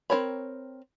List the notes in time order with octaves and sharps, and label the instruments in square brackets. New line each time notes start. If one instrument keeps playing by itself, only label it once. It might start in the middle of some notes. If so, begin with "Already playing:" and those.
[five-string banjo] C4 E4 A#4 C#5 B5